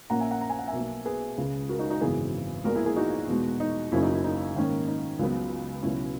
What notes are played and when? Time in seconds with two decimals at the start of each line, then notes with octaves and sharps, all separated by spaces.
0.10 A#1 A#2 A#3 C#4 F#5 A#5
0.20 E5 G#5
0.31 F#5 A#5
0.41 A#5
0.50 G#5
0.59 F#5
0.67 E5 G#5
0.73 B1 B2 F#3 A#3
1.05 G#4 B4
1.37 C#2 C#3 G#3 C#4
1.69 F#4 A#4
1.79 D#4 F#4
1.90 D#4 F#4
2.00 G#1 F#2 C#3 E3 B3 E4 G#4
2.64 A#1 A#2 G#3 B3 F#4 A#4
2.75 E4 G#4
2.86 E4 G#4
2.96 D#4 F#4
3.28 E2 B2 G#3
3.60 D#4
3.92 F#1 F#2 C#3 F#3 C#4 E4
4.02 D#4
4.13 E4
4.24 D#4
4.55 G#2 D#3 A#3 C#4
4.88 D#4
5.19 C#2 C#3 F#3 B3
5.83 C#2 B2 F#3 C#4 E4